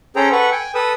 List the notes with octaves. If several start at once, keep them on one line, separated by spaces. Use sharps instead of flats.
C#4 G#4 A4 C5 G5 A#5
A4 B4 F#5 C#6
G5 G#5
A4 B4 D#6 E6